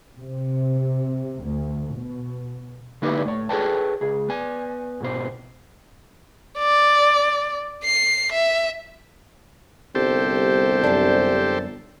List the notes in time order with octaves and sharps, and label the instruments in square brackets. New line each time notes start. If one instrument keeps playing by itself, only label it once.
[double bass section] C3
D2
B2
[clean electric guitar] D3 A#3 D#4 E4 G4 B4
A2 C#5
G#4 A4 B4 C#5 G5 A5
C#2 G#4
B3 G#5
G#2 B2 B3 C5
[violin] D5
C7
E5
[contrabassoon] G1 [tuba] C2 [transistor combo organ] G4 A4 C5
[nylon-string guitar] F#2 D4